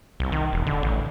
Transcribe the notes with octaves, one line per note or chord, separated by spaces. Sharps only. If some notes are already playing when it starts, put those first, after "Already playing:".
C2
D#3
E1
D3
A1